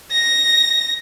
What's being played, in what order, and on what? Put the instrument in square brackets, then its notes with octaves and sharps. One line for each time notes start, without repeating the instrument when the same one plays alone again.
[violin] A#6